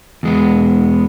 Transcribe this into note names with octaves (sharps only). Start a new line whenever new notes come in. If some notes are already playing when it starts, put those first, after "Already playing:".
E2 G#3 B3